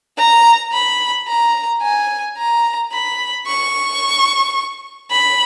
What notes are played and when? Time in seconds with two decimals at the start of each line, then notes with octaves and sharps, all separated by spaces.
0.18 A#5
0.73 B5
1.28 A#5
1.83 G#5
2.38 A#5
2.93 B5
3.47 C#6
5.12 B5